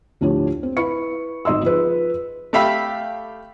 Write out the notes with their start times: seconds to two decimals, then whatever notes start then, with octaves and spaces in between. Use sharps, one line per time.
0.21 D2 A2 F3 D4 G4 C#5
0.63 C4
0.77 E4 B4 B5 C#6 C#7
1.45 G#1 D#3 D#5 C6 E6
1.63 F3 G#4 B4
2.53 A3 G4 E5 F5 B5